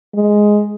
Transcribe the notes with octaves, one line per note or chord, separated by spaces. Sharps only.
G#3